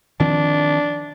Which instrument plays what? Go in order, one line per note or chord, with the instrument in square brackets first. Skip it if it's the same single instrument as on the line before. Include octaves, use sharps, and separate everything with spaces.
[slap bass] D#3 F3 C4 [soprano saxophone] D4